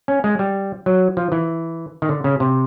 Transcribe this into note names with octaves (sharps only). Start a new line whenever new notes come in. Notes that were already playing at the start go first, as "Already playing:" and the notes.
C#4
G#3
G3
F#3
F3
E3
D#3
D3
C#3
C3